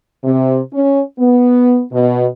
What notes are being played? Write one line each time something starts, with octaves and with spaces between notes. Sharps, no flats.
C3
C#4
B3
B2